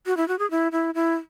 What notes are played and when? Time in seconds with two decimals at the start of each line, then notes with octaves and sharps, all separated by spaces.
0.06 F#4
0.17 E4
0.28 F#4
0.39 G#4
0.51 E4
0.72 E4
0.95 E4